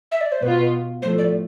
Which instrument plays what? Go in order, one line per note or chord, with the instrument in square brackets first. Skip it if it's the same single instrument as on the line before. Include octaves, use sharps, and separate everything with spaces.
[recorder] E5
D5
C5
[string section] B2 B3 F4 [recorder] B4
[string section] A2 F3 A3 [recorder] C5
[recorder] D5